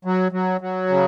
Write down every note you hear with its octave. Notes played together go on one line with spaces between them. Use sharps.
F#3
F#3
F#3
C#3